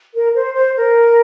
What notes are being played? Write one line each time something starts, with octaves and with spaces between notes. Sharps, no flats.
A#4
C5
C5
A#4